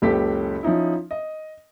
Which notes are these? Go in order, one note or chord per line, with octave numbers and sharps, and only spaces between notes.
F#1 C#2 C#4 G4 A4 B6
F3 C#4 D#4 E4
D#5